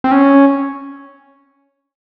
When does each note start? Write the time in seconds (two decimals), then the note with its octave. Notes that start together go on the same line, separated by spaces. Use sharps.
0.04 C4
0.11 C#4